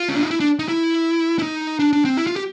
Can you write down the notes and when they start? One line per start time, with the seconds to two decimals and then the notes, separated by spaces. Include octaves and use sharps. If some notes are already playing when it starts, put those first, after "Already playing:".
Already playing: F4
0.09 C#4
0.15 D4
0.24 D#4
0.31 E4
0.40 D4
0.59 D#4
0.68 E4
1.39 E4
1.42 D#4
1.79 D4
1.93 D4
2.05 C4
2.17 E4
2.27 F4
2.36 G4